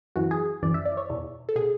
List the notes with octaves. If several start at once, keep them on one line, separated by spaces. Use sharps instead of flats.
F#2 E3 F#4
G#4
F#2 E3 D5
E5
D5
C#5
E2 B2
A4
B2 G#4